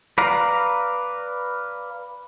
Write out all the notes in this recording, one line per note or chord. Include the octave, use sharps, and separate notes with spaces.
B4 D5 F5 A#5